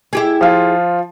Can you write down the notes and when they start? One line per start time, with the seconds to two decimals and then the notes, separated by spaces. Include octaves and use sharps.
0.13 E4 G4 G#4
0.41 F3 F4